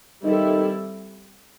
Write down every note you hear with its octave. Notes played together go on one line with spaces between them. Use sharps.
D#3 G3 C4 E4 A4